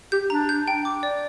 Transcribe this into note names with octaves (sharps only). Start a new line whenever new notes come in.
G4 G6
D4 A#5
G6
G5
D6
D5